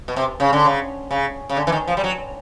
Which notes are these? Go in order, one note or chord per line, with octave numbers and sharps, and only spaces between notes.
B2
C3
C#3
D3
C#3
C#3
C#3
D3
E3
D#3
F3
G3
F#3